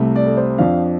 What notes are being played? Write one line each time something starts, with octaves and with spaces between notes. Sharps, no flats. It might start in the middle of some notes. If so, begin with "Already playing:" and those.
Already playing: C2 C3 A3
D5
A4
C5
F2 F3 D4 F5